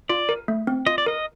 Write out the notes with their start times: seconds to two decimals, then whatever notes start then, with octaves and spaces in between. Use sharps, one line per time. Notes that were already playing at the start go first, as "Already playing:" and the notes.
0.09 F4 D5
0.29 A#4
0.48 A3
0.67 C4
0.87 F4 D#5
0.98 D5
1.06 A#4 D#5